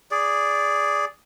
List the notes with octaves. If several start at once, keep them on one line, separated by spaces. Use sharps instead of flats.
G#4 D5